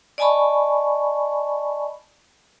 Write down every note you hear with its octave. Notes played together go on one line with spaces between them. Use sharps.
D5 D#5 G#5 A5 B5 C#6